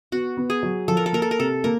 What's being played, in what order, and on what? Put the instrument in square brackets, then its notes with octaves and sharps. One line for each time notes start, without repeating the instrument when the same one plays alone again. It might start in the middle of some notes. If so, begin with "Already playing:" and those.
[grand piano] B3 [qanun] F#4
[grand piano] B3
[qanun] G#4
[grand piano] F#3
[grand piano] F3 [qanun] A4
[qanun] A#4
A4
[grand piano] A#3 [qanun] A#4
[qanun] A4
A#4
[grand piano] C3 [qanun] A4
[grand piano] A#3 [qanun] A#4